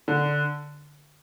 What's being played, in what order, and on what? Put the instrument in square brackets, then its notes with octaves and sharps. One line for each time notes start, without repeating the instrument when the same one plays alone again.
[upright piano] D3